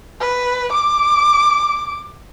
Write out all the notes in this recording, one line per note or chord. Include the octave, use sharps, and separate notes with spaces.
B4
D6